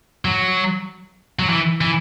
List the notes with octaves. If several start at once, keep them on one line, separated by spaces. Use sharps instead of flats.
F#3
F#3
E3
E3